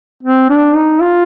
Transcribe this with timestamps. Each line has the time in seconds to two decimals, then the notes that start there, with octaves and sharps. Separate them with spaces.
0.23 C4
0.49 D4
0.75 D#4
1.01 F4